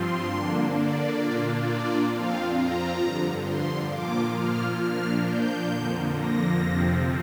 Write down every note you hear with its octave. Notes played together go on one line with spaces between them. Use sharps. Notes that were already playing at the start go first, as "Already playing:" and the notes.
Already playing: G2 F3 C4 F4 C6
D3 A#3 D4
D5
A#2 A#3 D4 F4
D5
F2 F3 C4 F4 F5
A#5
G2 D3 F3
C6
A#2 F3 A#3 F4 D6
F6
A#2 F3 A#3 D4 F6
G6
F2 D3 F3 A#3
A#6
F2 C3 F3 C4